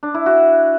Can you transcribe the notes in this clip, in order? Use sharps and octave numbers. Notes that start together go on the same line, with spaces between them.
D4
E4
F#4